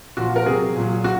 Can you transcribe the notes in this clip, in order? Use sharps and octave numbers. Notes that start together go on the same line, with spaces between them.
A#2 F3 F#4
A#4
C3 F#3 G#4
A#2 F#3
F#4